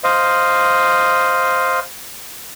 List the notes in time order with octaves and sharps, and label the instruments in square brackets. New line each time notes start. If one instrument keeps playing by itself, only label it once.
[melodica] C5 D#5 F5